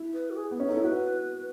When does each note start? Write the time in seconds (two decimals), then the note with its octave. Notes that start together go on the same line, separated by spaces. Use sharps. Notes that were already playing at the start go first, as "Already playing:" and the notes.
Already playing: E4
0.14 B4
0.31 F#4
0.37 G#4
0.51 B3
0.60 C#4
0.68 D#4 A4
0.75 E4
0.83 F#4 B4